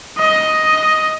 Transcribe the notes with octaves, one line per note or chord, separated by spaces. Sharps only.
D#5